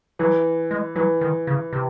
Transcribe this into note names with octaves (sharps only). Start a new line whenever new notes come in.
E3 F#3
G#3
E3 F#3
D#3
C#3
C3